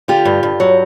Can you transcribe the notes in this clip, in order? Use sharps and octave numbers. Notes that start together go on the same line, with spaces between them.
D3 F4 G4
G2
G2
F#3